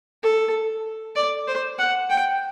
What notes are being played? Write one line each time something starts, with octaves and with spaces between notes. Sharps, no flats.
A4
D5
C5
F#5
G5